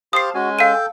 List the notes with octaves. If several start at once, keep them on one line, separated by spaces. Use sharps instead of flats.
G4 C5 F5 A5 D#6 C7
G#3 C#4 F#4 G#5
A4 F5 G5 D#7